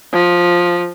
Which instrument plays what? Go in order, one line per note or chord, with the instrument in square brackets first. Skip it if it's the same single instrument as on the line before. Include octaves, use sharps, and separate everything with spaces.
[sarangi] F3